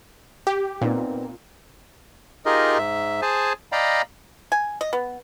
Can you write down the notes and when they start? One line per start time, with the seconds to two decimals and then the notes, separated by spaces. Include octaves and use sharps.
0.47 G4
0.81 A#2 B3 C4 D#4
2.46 D#4 F4 G4 G#4 A#4 D#5
2.78 G#2 E5
3.22 G#4 C5 G#5 A5
3.72 D5 D#5 F5 G5 A#5 B5
4.52 G#5
4.81 D#5
4.93 B3